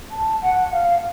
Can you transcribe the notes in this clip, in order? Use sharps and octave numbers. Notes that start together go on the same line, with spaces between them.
A5
F#5
F5